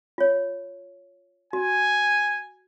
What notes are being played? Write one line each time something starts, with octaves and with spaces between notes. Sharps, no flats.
F4 C#5
F#4 G#5